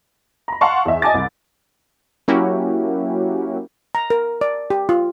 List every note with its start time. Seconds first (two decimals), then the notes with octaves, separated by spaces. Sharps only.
0.48 A#5 B5
0.61 F5 F#5 A5 C6 C#6
0.85 E2 E5
1.02 D#5 G#5 A5 D6 A6
1.14 C2
2.28 F#3 A#3 C#4 E4 F#4 G4
3.95 A#5
4.10 A#4
4.41 D5
4.70 G4
4.89 F4